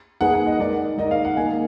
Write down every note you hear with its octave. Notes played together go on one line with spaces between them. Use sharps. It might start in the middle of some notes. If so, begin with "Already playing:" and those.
A#3 D#4 G#4 B4 F#5
F#5
D#5
G#3 D#4 A#4 D5
G#3 D#4 A#4 D#5
F5
F#5
A#3 D#4 A#4 G#5